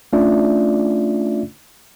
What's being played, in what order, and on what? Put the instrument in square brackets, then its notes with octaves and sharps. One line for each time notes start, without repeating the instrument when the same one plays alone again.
[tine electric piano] A3 C#4 D4 F4 D5 E5